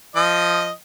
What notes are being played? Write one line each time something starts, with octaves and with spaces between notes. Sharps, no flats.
F3 D#5 D#6